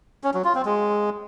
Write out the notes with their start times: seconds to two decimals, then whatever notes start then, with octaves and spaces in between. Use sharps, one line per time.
0.24 C#4
0.34 F#3
0.44 F4
0.55 C4
0.65 G#3